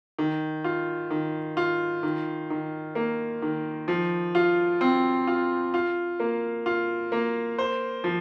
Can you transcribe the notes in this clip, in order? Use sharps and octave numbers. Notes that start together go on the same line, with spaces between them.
D#3
F4
D#3
F4
D#3
D#3
A#3
D#3
F3
F4
C4
F4
F4
A#3
F4
A#3
C5
F3